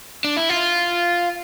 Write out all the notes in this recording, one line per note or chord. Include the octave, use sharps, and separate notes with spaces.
D4
E4
F4